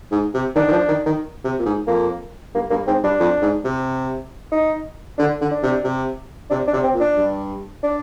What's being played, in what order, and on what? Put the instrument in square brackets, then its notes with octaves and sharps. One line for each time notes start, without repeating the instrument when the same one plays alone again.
[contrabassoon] G#2
C3
[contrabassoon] D#3 [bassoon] D4
[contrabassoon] D#3
F3
D#3
D#3
C3
A#2
G#2
[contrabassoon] F2 [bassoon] A#3
[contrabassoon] G2 [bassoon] A#3
[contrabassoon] G2 [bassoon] A#3
[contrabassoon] G#2 [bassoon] C4
[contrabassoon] G2 [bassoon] D4
[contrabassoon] F2
G#2
C3
[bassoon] D#4
[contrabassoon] D3 [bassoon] D4
[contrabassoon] D3
[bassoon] D4
[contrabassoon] C3
C3
[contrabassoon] C3 [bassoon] D4
[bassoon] D4
[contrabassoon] C3
[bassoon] C4
[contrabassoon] A#2
[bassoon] D4
[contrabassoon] G2
[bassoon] D4